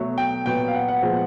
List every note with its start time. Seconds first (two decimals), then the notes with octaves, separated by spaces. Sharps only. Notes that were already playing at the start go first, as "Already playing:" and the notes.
Already playing: B2 F#3 A3
0.18 G5
0.46 A#2 F#3 B3 G5
0.68 F5
0.75 F#5
0.88 F#5
1.02 A#2 F3 G#3 B3